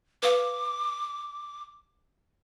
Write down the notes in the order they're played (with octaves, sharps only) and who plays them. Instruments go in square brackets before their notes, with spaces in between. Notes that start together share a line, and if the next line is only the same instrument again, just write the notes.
[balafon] B4 F5 [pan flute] D6